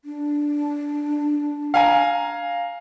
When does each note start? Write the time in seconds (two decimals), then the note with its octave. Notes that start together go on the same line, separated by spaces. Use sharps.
0.05 D4
1.74 F5 G#5 A#5